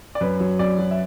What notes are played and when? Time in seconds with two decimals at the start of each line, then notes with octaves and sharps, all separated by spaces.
0.15 D5
0.21 F#2 B4
0.40 F#3
0.59 F#2 D5
0.79 F#3
0.91 E5